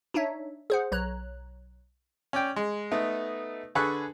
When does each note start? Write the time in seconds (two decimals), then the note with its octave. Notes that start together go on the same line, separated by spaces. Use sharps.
0.14 D4 D#4 C#5 E5
0.70 G#4 C5 F#5
0.92 B1 C#5 A#5 F#6
2.33 C#4 D5 G5
2.56 G#3
2.91 A3 B3 D#4
3.75 D3 G#4 A4 B4 C#6 F#6